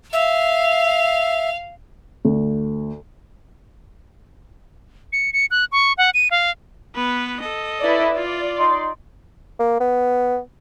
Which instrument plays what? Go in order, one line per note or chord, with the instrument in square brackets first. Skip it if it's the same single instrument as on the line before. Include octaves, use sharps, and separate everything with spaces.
[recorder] E5 [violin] F5
[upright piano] D2
[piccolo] C#7
C#7
F#6
C#6
F#5
D#7
F5
[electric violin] B3 B4
A4 D#5
[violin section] E4 B4 D5
[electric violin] F4 [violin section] D5
[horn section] D#4 C6
[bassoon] A#3
B3